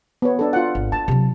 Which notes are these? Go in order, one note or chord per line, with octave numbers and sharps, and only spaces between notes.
B3 C#5
D4 A4
F4 F#5
G#1
E4 A5
C3 F#3